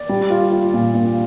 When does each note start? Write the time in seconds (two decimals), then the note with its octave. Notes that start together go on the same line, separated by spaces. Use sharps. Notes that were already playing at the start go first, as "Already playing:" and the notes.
Already playing: D5
0.09 G3
0.30 F4
0.52 F4
0.74 A#2
0.94 A#2